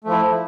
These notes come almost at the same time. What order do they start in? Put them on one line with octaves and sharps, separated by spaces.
A3 F3 E4